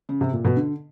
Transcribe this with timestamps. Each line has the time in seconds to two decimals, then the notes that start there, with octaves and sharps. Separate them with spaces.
0.09 C#3
0.21 C3
0.33 A#2
0.45 B2
0.57 D3